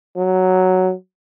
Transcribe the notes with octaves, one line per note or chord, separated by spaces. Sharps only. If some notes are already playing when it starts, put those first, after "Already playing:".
F#3